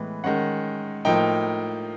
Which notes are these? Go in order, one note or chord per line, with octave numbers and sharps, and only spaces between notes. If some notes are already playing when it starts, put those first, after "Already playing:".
Already playing: A2 E3 G#3 B3
D#3 G#3 C#4 F#5
A2 F3 A#3 D#4 G5